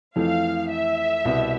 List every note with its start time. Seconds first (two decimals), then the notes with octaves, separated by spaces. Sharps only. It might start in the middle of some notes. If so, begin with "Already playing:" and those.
0.16 F2 E3 A3 E4 F5
0.71 E5
1.25 C2 B2 B3